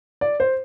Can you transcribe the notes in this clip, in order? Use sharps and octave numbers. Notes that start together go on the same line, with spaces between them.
D5
C5